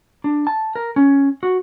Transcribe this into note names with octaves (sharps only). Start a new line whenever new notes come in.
D4
A5
A#4
C#4
F#4